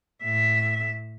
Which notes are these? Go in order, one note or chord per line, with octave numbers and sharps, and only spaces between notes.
A2 E5